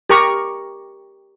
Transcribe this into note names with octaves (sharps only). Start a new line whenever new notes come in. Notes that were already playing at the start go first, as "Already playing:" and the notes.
G4 A#4 A#5 C#6